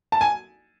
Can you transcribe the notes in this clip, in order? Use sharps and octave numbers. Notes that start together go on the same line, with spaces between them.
A5
G#5